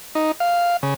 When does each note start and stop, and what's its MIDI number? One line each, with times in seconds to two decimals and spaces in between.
0.15 0.32 63
0.40 0.77 77
0.83 0.94 49